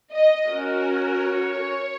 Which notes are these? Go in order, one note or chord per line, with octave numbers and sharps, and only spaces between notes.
D#5
C#4 F#4 A#4
C#5